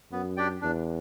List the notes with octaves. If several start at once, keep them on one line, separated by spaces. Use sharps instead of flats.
F#2 B3
D4 G4 D5 G5
E2 D4